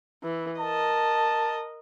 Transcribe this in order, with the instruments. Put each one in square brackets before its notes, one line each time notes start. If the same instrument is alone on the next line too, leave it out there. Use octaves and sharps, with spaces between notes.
[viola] E3
[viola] A#4 D#5 [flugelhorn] A5